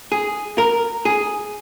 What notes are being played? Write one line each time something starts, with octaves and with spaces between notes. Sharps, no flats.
G#4
A#4
G#4